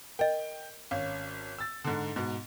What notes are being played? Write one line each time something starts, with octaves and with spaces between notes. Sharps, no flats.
A#4 D#5 G5
G#1 C#4 F5
E6 A6
G#2 D3
G#2 B2